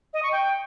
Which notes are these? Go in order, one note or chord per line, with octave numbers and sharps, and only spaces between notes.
D#5
C#6
G5